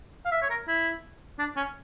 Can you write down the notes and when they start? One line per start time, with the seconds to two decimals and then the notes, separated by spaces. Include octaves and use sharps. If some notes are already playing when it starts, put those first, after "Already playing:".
0.25 F5
0.31 E5
0.42 C#5
0.50 A#4
0.68 E4
1.39 D4
1.56 C#4